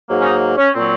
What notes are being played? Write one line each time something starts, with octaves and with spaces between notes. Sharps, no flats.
G#2 F#3 A#3
C#4
D#4
C#4
A#2 F#3 C4